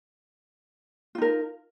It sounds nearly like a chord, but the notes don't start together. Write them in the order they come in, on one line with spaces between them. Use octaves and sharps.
F4 D#4 A#4